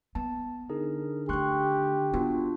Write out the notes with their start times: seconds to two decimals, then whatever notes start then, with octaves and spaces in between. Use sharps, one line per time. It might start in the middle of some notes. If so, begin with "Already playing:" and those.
0.15 B3 A5
0.69 D3 D#4 G#4 A#4
1.29 D#3 A3 G4 C6 C#6 F#6
2.14 B3 D4 F4 F#4